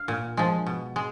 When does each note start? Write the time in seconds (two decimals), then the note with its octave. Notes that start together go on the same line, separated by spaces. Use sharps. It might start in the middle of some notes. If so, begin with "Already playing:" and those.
Already playing: F5
0.08 A#2
0.37 F3 G#3
0.66 B2
0.96 G#3